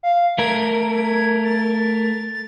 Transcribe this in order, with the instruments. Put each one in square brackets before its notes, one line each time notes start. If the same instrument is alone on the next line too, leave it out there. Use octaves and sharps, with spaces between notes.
[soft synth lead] F5
[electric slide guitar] A3 A#4 [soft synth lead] G#6
[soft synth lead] A6